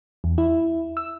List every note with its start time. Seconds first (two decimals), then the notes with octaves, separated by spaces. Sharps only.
0.24 E2
0.38 E4
0.97 E6